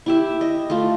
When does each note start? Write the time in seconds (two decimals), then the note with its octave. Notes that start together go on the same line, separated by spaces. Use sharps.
0.06 E4 G4 E5
0.41 D#5
0.70 A3 F4